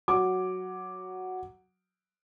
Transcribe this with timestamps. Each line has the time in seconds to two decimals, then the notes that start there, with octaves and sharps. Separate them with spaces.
0.08 F#3 D6